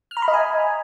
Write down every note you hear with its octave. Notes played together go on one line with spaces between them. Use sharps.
F6
A#5
B5
D#5
G#5